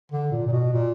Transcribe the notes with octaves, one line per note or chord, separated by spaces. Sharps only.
D3
A#2
A#2
B2
A#2